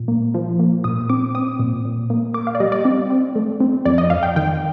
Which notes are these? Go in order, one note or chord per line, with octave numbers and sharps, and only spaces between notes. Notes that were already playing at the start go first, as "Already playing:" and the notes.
Already playing: A#2
A#3
F3
A#3
A#2 D#6
C4 D6
C4 D#6
A#2
A#2
A#3
A#3 D6
F5
D5
G3 D#5
D5
C4
C4
A3
C4
F2 D5
D#5
F2 F5
G5
D#3 G5